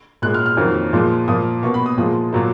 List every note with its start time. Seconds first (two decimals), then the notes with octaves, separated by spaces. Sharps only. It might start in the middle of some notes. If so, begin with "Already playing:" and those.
0.22 A#2 G#3 F#6
0.34 F6
0.46 F6
0.57 F2 D#3 F#3 A#3
0.93 A#2 F3 G#3
1.28 A#2 F3 A#3 D#6
1.63 B2 A#3 C#6
1.74 B5
1.86 D#6
1.97 A#2 F3 G#3 D#6
2.33 A#2 F#3 A#3